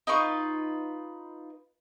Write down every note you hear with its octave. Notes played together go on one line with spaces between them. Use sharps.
D#4 F4 B4 C#6